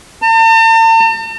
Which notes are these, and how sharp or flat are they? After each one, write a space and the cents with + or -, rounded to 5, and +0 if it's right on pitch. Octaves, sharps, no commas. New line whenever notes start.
A5 +45